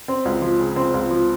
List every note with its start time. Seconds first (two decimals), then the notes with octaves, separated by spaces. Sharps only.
0.08 C4
0.25 C#2
0.42 F3
0.59 C#3
0.76 C4
0.94 C#2
1.11 F3